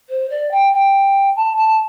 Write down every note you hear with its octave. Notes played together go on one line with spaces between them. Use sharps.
C5
D5
G5
G5
A5
A5